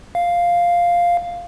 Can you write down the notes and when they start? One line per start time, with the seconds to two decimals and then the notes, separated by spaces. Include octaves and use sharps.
0.15 F5